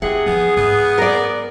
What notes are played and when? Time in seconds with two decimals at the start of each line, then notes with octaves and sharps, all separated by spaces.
0.02 C3 E4 G#4 F#5
0.26 F3 B3
0.57 G#2 B3
0.98 A#4 D5